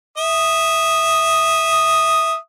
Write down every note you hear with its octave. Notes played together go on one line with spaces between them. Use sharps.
E5 D#6